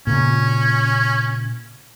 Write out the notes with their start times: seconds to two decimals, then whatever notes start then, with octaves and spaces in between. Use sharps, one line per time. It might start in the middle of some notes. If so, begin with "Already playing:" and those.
0.07 A#2 C#3 C#4